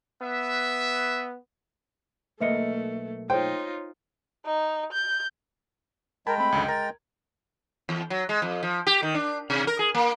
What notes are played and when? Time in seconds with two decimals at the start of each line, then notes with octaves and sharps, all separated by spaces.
0.22 B3 B4 E5
2.40 B1 A3 A#3 B4 D#5 E5 C#7
3.30 D#4 F4 C5 C#5 G5 C6
4.46 D#4
4.93 G6
6.27 G#3 A#4 G5 A5 B5 G#6
6.38 A3 C4 B5
6.52 C#2 F#2 D3
6.68 A#4 A#5 A6
7.89 E2
8.10 F#3
8.29 G#3
8.42 F2
8.63 F3
8.87 G4
9.03 D#3
9.14 D4
9.50 C3
9.67 A#4
9.79 G#4
9.95 A#3